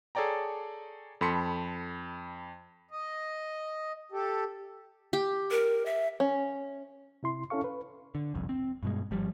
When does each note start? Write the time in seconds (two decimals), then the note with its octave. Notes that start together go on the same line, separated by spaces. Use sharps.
0.15 G#4 A4 C#5 D5 G5 A#5
1.21 F2 A4 B5 C6 B6 C#7
2.91 D#5
4.12 G4 A4
5.13 G4
5.51 A#4
5.86 E5
6.20 C#4
7.23 C3 E4 C6
7.50 C#4 E4 A4 F5 C#6
7.64 B4
8.15 D3
8.34 F#1 C2 F2
8.49 C4
8.83 G2 B2 G#3
9.11 G#1 F3 G3